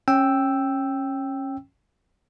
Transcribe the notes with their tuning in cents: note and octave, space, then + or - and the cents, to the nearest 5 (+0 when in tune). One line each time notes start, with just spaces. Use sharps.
C#4 -20 G5 +0 E6 +0